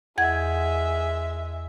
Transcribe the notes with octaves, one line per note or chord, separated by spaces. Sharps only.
E2 G#3 E5 F#5 G#6